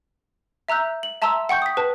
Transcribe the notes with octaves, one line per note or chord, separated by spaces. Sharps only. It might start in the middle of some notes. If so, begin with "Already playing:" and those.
E5 A#5 E6 F#6 G6
F#7
E5 A5 A#5 C6 E6
F#5 G5 C#6 G6
D#6 B6
B4 A5